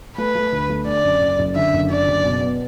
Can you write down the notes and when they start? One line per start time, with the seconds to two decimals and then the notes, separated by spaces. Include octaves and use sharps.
0.17 A3 B4
0.35 A3
0.52 D2
0.69 A3
0.87 D3 D5
1.04 F#2
1.21 F#1
1.39 F#1
1.56 D3 E5
1.73 F#1
1.90 D3 D5
2.08 F#1
2.24 B2
2.41 B3